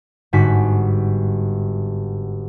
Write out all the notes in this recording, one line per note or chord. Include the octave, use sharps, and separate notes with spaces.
G1 G#2 F#4 B6